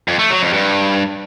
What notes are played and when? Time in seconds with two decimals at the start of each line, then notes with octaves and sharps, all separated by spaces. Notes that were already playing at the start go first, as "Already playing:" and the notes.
0.08 F2
0.19 A3
0.30 F#3
0.42 F2
0.53 G2